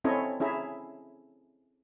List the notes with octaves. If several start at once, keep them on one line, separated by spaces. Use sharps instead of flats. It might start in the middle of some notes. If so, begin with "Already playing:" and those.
C4 C#4 E4 A4 C#5 D#5
C#4 E4 G#4 E5 A#5